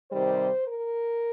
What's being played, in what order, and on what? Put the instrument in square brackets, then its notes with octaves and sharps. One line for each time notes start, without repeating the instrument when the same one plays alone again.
[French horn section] C3 D#3 G3 C5
A#4